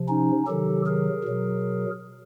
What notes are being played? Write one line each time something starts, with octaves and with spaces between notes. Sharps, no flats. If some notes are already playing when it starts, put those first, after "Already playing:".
Already playing: C3 F3
C#4 D#4
C3 D#3 F#3 G4 A4
G#4 A#4
B2 F#3